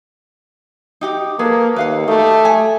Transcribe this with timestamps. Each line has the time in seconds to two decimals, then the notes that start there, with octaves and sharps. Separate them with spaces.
1.01 D#4 G4 F#5
1.39 A#3 G#4 A4 B4
1.76 D#2 B4 F5 F#5
2.08 A3 D#4 G4
2.45 G#5